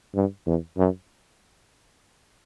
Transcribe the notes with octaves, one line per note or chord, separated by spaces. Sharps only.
G2
E2
F#2